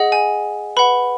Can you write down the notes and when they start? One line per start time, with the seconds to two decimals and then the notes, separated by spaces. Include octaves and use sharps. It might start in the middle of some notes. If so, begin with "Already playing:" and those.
Already playing: G#4 D#5 F#5
0.12 G#5
0.77 B4 F#5 B5